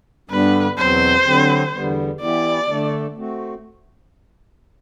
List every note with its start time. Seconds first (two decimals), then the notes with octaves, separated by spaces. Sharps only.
0.30 G2 D3 G3 B3 D4 B4
0.78 E2 B2 F#3 C4 C5
1.25 D3 F#3 C4 G4
1.73 E2 D3 G3 B3
2.21 E3 B3 E4 G4 D5
2.68 D3 A3 D4 A4
3.17 A3 C4 F#4